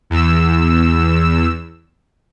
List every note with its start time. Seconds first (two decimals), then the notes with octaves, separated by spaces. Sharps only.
0.10 E2 E6